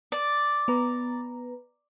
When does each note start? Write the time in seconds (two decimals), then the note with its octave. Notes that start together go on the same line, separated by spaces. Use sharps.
0.12 D5
0.68 B3 B4 A#5